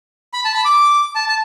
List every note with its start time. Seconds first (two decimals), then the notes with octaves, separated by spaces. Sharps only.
0.34 B5
0.45 A5
0.54 B5
0.65 D6
1.15 A5
1.29 A5